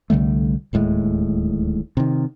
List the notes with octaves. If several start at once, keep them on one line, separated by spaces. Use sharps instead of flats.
C2 D3 G3 A3
D1 D#2 A2 G#3
C3 D#3